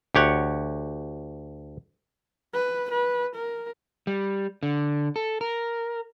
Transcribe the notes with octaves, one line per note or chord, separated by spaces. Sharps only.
D2 G4 C#5 F#5
B4
B4
A#4
G3
D3
A4
A#4